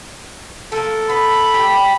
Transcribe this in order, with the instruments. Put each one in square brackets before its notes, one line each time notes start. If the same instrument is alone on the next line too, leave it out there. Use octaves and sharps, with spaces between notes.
[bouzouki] F3 A#3 [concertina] A4
[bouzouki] B3 [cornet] B5
[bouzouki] G4 G5